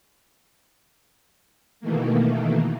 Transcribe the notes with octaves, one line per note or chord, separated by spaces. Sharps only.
B2 D#3 E3 A3 A#3